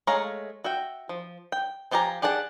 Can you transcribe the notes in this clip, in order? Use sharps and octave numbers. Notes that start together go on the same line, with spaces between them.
G#3 A3 C#5 F5 A#5
F#4 E5 G5
F3
G5
F3 F4 G4 G#5 A#5
G4 G#4 D5 F#5 A5